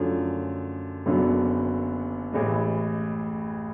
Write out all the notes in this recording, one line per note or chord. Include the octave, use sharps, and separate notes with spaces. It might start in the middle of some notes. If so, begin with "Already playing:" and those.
Already playing: F#2 D3 F3 A3 C#4
F#1 F#2 D3 F#3 B3
A1 A2 E3 G#3